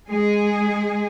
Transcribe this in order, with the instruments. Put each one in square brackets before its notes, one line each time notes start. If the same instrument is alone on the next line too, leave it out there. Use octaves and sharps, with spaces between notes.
[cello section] G#3 G#4